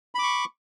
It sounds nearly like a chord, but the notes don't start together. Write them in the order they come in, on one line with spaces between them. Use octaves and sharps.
B5 D6 C#6